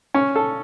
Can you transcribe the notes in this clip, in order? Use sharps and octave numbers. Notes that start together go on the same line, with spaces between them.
C#4
A4